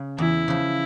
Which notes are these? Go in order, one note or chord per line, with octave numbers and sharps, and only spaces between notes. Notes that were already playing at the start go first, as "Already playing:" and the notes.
Already playing: C#3
E2 E4
C#3 F3